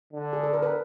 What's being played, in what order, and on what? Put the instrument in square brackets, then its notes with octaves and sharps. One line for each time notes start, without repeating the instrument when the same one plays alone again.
[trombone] D3
[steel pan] G#4
A4
A#4
B4